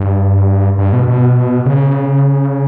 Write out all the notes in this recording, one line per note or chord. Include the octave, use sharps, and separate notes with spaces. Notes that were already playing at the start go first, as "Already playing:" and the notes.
Already playing: G2
G2
B2
B2
C#3